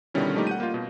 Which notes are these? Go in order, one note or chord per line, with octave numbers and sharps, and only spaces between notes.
B2 D3 D#3 G3 C#4 E4
F3 G3 A3 A#3 D#4 G4
F#5 G6 D#7
A#3 F4
B2